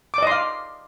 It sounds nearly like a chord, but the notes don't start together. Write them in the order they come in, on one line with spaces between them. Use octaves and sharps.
D6 D5 D#5 C6 F5